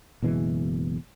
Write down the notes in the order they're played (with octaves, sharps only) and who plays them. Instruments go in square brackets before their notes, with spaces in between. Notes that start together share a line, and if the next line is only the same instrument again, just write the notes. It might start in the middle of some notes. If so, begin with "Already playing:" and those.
[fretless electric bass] F#1 B2 E3 G#3